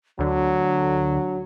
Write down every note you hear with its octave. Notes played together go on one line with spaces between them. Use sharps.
D2 D3 F#3 D4